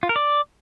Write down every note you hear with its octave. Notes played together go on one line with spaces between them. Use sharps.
F4
A#4
D5